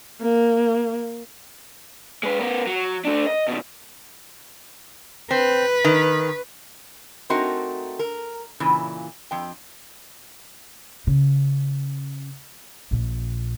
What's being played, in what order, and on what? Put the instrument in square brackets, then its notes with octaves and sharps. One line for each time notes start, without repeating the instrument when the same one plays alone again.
[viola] A#3
[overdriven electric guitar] G#3 B4
B3 A#4
F#3
A3 D4
D#5
B2 D#3
[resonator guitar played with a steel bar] C4 [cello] B4
[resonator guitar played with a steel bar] D#3
A3 C4 D#4 F#4 A#4
A#4
A#2 C#3 E3
F2 G5
[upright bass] C#3
A#1 A#2